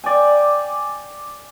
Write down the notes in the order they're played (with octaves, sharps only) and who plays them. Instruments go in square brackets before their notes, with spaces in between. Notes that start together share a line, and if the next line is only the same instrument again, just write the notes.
[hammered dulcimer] D5 G5 G#5